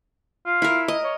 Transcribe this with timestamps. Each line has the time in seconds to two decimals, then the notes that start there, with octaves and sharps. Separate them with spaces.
0.45 F4
0.62 E4 A#4
0.88 D#5
1.04 C#5